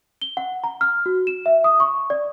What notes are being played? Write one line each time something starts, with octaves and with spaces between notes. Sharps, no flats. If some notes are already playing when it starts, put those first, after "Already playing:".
G7
F#5
A#5
F6
F#4
E7
E5
D#6
C#6
D5